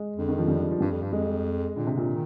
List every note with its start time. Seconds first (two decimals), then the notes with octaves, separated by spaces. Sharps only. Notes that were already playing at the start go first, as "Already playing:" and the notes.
Already playing: G#3
0.16 F2 D3
0.29 D#3
0.39 F3
0.48 G3
0.71 F3
0.80 G2 G3
0.91 F2
1.02 G2
1.13 F2 G#3
1.76 A#2 D3
1.87 C3
1.97 A#2
2.08 D#3